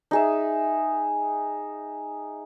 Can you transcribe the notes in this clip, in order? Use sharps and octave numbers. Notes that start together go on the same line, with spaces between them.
D#4 G#4 E5